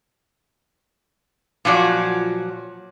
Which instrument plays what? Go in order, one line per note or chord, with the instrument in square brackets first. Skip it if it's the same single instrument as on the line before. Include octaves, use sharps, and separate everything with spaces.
[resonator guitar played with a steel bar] A#2 F3 F#3 D5